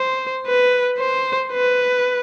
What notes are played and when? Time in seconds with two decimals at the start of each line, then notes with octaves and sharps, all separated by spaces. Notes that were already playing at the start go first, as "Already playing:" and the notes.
Already playing: C5
0.47 B4
0.99 C5
1.52 B4